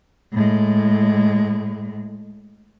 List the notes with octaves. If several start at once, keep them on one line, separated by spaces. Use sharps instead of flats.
A2 G#3